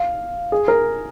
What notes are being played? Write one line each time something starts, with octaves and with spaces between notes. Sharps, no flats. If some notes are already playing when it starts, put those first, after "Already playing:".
Already playing: F5
G#4
A#4